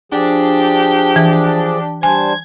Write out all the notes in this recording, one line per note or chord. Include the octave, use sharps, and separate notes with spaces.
F3 D4 G4 G#4
E3
G3 D4 C5 G#5 G#6